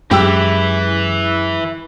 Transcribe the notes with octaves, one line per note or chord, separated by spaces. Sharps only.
F#2 E3 G#3 E4 G4 G5 E6